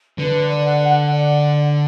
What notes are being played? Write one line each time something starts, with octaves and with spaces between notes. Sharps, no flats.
D3 B4
D5
F#5
F#5
D5